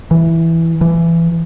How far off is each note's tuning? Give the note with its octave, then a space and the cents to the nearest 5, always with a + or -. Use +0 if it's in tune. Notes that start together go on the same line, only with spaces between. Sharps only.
E3 +0
E3 +20